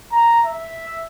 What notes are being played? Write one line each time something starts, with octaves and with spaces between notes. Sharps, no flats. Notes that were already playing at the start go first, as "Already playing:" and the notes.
A#5
E5